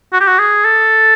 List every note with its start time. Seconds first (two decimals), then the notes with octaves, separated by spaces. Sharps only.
0.13 F#4
0.21 G4
0.27 F#4
0.39 G#4
0.65 A4